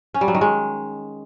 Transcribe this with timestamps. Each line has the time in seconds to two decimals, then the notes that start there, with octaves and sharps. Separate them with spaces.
0.14 C#4
0.21 G3
0.28 F#3
0.35 D#3
0.41 G#3